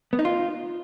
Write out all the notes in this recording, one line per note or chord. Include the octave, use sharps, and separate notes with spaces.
B3
D#4
F4